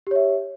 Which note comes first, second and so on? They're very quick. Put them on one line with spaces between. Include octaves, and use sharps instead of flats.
G4 C#5 E5